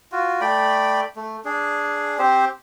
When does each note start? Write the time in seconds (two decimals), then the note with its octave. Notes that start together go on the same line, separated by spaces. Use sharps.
0.12 F4 F#4
0.41 A3 D5 G5 B5
1.16 A3
1.45 D4 G#4
2.19 C4 G4 C5